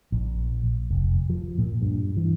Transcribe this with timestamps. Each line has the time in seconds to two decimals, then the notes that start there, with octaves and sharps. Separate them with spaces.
0.12 A#1
0.91 F1
1.30 F3
1.58 A#2
1.82 G2
2.17 E3